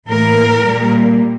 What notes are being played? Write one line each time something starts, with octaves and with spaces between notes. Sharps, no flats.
A2 E3 A#3 A#4
A#2 G3 A#3